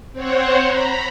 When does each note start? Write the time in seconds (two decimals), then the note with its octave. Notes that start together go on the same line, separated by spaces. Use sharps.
0.13 C4 C5 C#5 F#5
0.62 A#5 B5